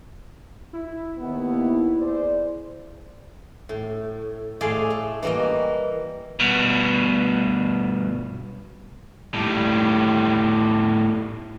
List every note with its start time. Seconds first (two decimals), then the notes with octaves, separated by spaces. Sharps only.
0.73 E4
1.18 D#2 B3
1.98 G#4 C5 D5
3.69 A2
4.61 A2 A3 G#4 D5 F5 C6
4.90 A3
5.23 E3 G3 A#3 A#4 D#5
6.40 G2 B2
9.34 A2 G3